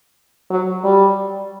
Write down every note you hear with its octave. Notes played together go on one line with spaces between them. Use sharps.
F#3
G3